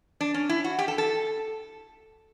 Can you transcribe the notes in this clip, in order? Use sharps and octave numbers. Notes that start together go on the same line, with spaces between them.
D4
C#4
E4
F#4
G4
A4
A4